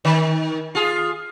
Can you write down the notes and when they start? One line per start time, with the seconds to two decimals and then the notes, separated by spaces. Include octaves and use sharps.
0.05 D#3
0.75 F4 G#4